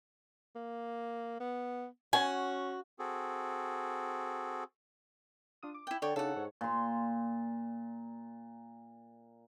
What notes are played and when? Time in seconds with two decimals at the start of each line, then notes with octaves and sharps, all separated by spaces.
0.55 A#3
1.40 B3
2.13 C#4 F#4 G#5
2.99 C4 F#4 G#4 A4
5.63 D4 F4 D#6
5.74 D6
5.87 E4 G5
6.02 D3 C#5 D5 G5
6.16 C#3 D4 D#4 G4 A4 F#5
6.36 G#2 C#5
6.61 A#2 C6